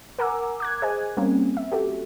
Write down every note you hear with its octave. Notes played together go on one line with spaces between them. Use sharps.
A#4 F#5 G#5 A#5 D6 E6
D6 F#6 G#6
G#4 C5 D#5 G#5
G3 A#3 C4 C#4
E5
F#4 G4 A4